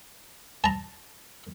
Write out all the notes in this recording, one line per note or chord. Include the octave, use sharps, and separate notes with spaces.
A5 A#5